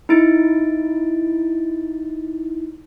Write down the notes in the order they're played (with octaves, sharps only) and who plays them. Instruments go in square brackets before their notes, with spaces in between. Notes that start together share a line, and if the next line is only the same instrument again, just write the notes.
[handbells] D#4 E4 A6 D7